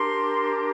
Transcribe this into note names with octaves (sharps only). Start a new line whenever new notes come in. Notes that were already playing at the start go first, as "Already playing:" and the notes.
Already playing: D4 G4 A#4 C6